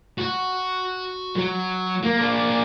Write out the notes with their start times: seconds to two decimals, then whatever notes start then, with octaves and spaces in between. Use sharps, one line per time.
0.18 F#4
1.36 F#3
2.03 A#3
2.17 A#3 D4